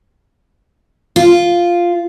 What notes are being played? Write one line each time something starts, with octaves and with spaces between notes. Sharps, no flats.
F4